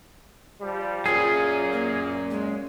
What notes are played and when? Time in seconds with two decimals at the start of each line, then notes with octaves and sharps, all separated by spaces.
0.61 F3 G3
1.06 A#2 F#3 C#4 F4 G#4
1.73 A#3
2.31 G#3